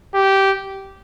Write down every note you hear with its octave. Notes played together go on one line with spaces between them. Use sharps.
G4